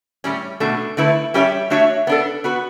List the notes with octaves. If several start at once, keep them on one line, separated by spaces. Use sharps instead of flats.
A2 G3 C#4
B2 A3 D4
D3 A3 E4 B4
G3 C#4 G4 C#5 E5
A3 D4 F#4 C#5 E5
B3 D4 A4
B3 F#4 B4